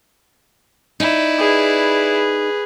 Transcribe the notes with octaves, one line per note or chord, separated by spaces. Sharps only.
D#4 E4 D5
G#4 B4